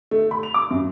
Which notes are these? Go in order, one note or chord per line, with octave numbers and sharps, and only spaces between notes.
A3
B5
F7
D6
F#2